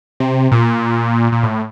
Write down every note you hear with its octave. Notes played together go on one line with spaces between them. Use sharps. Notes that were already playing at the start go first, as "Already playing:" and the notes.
C3
A#2
A#2
A2